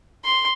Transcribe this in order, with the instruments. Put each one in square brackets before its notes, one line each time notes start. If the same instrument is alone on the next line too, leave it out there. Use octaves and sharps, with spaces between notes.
[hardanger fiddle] C6